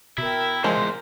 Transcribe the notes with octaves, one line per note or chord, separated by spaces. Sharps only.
B2 E4 A#4 E5 G5
E2 F3 G#3 A#4 C5